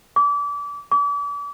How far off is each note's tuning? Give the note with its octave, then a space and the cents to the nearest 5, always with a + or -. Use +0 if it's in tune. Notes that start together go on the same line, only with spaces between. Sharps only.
D6 -30
D6 -40